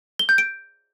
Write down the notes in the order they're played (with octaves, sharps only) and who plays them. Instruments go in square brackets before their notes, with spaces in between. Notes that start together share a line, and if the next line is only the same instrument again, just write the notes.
[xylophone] G7
G6
D7